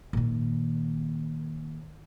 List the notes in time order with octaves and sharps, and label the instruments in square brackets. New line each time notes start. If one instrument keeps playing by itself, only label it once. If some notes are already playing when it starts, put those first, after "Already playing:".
[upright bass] A#2 D#3